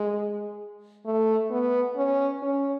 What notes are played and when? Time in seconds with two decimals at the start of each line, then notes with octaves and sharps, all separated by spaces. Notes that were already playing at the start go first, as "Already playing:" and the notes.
Already playing: G#3
1.06 A3
1.50 B3
1.96 C#4
2.42 C#4